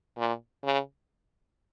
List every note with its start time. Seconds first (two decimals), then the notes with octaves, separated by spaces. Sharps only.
0.17 A#2
0.64 C#3